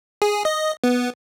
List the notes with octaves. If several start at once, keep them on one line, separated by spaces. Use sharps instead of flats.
G#4
D#5
B3